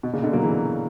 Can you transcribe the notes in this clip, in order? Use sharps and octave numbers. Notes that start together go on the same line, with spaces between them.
B2
A#2 C#3
B2 D3
F#3 A#3
C#3 E3